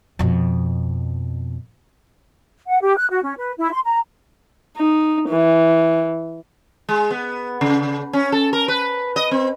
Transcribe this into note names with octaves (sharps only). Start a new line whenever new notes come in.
F2 B2
F#5
G4
F#6
F#4
C#4
B4
E4
C6
A#5
D#4
E3
G#3
B3
C#3
C#4
A4
A#4
B4
D#5
C4